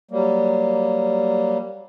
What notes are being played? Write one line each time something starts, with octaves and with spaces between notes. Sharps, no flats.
F#3 G3 A#3